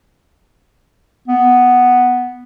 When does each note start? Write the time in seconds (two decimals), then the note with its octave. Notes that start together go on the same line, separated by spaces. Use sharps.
1.28 B3